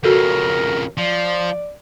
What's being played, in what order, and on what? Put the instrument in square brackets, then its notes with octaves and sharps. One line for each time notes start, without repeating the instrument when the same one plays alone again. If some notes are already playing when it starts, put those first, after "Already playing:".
[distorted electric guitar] F2 C#3 [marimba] F#4 A4 [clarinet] A#4
[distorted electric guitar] F3 [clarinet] D5